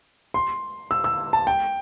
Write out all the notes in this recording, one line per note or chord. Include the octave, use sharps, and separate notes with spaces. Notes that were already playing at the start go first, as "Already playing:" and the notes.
C6
E6
E6
A5
G5